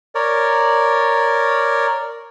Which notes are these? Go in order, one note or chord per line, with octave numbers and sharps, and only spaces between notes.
A#4 C#5 D5